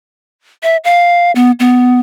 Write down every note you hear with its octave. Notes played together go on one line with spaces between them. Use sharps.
E5
F5
B3
B3